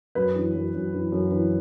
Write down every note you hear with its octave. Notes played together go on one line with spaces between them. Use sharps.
F#2 B4
E3
F#2
F#2
E3
F#2
E3